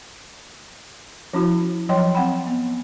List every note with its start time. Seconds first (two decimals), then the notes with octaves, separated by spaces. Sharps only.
1.33 F3 C#4 E4 F#4
1.89 F3 F#3 C#5 D#5 G5 C6
2.15 C4 F#5 G5 B5
2.47 B3